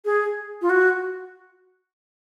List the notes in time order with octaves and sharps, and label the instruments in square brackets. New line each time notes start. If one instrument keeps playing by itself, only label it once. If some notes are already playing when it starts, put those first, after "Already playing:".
[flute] G#4
F4
F#4